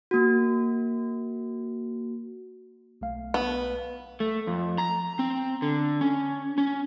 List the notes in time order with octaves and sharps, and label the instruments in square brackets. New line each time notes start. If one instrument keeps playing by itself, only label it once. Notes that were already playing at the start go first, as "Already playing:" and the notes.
[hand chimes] A#3 F#4
[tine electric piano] B1 A3 F5
[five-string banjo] B3
[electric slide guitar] A3
F2
A#5
C4
D3
C#4
C#4